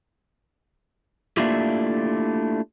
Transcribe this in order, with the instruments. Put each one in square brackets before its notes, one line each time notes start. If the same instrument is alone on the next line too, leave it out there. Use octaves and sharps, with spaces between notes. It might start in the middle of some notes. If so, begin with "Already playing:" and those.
[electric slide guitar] A3 A#3 D4 E4 F4 G4